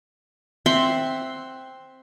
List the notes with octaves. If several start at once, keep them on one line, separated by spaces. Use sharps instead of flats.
C4 E5 F#5 C6